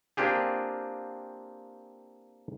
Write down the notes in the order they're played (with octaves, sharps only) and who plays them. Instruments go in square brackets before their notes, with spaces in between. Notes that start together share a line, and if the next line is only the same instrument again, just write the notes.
[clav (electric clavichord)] A#3 C4 D4 F4 G4 G#4